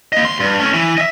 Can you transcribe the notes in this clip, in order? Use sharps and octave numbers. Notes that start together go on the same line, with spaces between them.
A#3 D#5
D2 C6
G2
A3 C#4
E3
D#5 E5